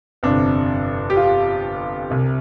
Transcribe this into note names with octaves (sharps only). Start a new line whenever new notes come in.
G1 F2 C3 D4
G4
F4
C2 C3